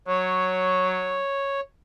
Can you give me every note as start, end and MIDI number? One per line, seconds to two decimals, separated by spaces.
0.08 1.20 54
0.08 1.60 73